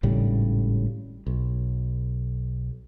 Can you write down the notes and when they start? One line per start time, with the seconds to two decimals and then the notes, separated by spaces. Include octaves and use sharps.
0.03 G#1 A2 C#3 G3
1.27 B1